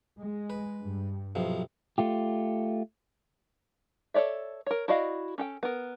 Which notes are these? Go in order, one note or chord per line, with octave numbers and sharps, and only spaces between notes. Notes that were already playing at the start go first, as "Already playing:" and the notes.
G#3
B4
G2
B1 C3 F3
A3 F4 G4
A4 B4 C#5 D5 E5
A#4 C#5
E4 F#4 D5 D#5 F5
C#4 A4 G5
B3 A#4